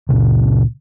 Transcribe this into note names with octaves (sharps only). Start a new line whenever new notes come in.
C#2 A#2 C#3